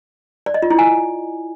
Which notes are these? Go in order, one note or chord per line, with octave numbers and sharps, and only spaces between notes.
D5
D#5
F4
E4
G#5